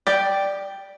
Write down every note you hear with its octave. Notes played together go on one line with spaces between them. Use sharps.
G4 D5 G5